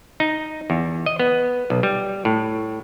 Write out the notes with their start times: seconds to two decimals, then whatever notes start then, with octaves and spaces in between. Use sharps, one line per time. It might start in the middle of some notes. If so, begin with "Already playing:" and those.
0.20 D#4
0.70 E2
1.06 D#5
1.20 B3
1.70 B1
1.83 G3
2.25 A2